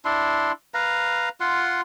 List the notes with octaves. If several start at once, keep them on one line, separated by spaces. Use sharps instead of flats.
D4 E4 C6
B4 F5 A#5
F4 F#5 C6